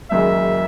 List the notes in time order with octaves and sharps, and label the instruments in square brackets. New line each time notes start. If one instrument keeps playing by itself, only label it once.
[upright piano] F#1 F#2 D#3 G#3 [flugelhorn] E5